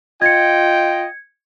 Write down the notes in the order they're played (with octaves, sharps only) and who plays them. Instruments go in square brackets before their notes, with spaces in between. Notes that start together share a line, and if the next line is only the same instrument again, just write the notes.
[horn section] F4 D#5 G5 [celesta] G#6 C#7